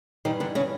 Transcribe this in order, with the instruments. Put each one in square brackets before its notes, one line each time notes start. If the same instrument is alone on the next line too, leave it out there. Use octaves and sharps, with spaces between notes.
[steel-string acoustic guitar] G2 D#3 E3 G3 D#4
D3 D4
C#3 C#4